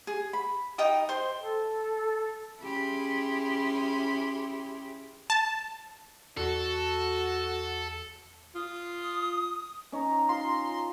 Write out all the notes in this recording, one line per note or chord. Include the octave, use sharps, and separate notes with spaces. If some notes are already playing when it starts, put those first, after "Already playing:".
G#4
B5
D#4 D#5 G5 D#6
C5 C6
A4
C#4 E4 G4 G#4 B5 C6
A5
E2 F#4 A4
F4 D#6
C#4 D#4 C#5 A#5
F4 C6